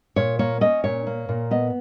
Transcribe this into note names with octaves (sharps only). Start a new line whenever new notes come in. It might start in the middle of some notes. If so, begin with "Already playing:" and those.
A#2 C#5
A#3 C#5
C#4 D#5
A#2 C#5
A#3
A#2
B3 D#5